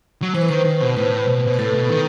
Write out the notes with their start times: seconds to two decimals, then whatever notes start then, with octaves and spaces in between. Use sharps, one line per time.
0.22 F#3
0.34 E3 C5
0.41 B4
0.49 D#3 C5
0.65 D#3
0.81 B2
0.96 A2 B4
1.27 B2
1.47 B2
1.54 B4
1.59 A2 A4
1.74 B2
1.90 D#3